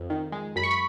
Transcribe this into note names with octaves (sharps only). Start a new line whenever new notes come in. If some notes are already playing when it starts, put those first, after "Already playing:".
Already playing: F2
D#3
G#3
F#2 B5
C#6
B5